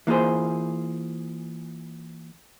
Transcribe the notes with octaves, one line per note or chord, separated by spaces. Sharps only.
E3 A#3 F4 G#4 C5